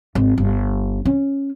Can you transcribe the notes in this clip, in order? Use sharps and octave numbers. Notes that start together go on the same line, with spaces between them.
G#1
G1
C#4